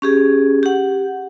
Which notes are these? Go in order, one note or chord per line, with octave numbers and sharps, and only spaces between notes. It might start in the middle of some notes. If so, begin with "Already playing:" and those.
C#4 G4 G#4
G4 F#5